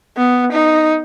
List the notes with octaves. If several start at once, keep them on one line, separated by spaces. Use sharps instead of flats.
B3
D#4